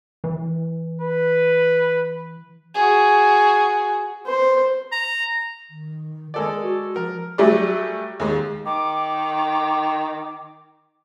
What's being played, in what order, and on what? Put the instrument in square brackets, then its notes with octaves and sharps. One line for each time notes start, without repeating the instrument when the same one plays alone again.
[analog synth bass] E3
[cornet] B4
[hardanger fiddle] F#4 G#4
[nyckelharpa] C5
[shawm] A#5
[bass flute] D#3
[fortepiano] G#3 A4 D5 [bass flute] A#4
[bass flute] F#4
[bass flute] F3 [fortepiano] A#4
[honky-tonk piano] F#3 G3 A3 G4 G#4 D5
D#2 G#3
[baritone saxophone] D#3 [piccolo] D6